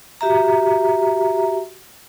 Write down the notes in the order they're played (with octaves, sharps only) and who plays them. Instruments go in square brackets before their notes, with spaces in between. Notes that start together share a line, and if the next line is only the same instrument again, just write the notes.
[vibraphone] F#4 G4 E5 A#5